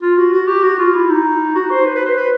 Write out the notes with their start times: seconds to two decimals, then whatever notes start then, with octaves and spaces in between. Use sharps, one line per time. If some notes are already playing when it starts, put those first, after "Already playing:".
0.02 F4
0.18 F#4
0.33 F#4
0.48 G4
0.63 F#4
0.79 F4
0.94 E4
1.10 D#4
1.55 F#4
1.71 C5
1.86 B4
1.96 B4
2.06 C5
2.17 B4